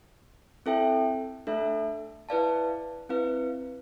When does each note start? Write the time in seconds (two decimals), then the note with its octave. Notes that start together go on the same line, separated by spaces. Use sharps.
0.66 C4 E4 A4 E5 G5
1.47 A3 D4 A4 E5
2.29 E4 B4 D5 F5 A5
3.09 C4 E4 B4 F5